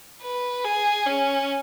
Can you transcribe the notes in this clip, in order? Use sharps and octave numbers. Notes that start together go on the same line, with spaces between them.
B4
G#4
C#4